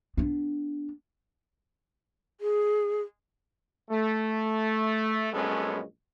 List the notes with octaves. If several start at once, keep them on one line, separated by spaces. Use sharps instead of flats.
B3 D4
G#4
A3
A#1 F#2 G#3 B3 C#4 A4